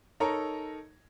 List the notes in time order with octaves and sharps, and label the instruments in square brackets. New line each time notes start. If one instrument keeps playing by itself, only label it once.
[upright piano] D#4 A4 A#4 C#5 A#5